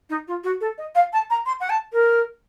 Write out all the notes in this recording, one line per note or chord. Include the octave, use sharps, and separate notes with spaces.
D#4
F4
F#4
A4
D#5
F5
A5
A#5
C6
F#5
A5
A#4